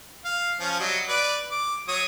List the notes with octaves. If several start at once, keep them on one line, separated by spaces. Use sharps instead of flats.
F5
F3 C#4
F#3 G3 D#5
B4 D5
D6
F#3 C#5 D#6